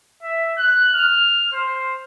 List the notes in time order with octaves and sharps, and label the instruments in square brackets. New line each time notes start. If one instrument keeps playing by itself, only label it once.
[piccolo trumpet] E5
F#6
F6
C5